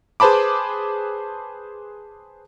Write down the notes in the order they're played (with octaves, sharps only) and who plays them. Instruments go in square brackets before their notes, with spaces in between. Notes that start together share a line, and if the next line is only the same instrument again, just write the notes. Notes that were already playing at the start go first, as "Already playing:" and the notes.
[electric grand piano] G#4 B4 C5 A5 B5 D6